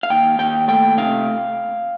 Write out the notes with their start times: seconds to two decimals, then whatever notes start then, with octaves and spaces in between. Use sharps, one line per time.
0.03 F5
0.10 D#2 G5
0.39 D#2 G5
0.68 A3 G5
0.98 C3 F5